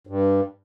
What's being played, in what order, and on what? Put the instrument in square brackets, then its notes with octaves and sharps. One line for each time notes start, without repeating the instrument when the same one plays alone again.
[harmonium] G2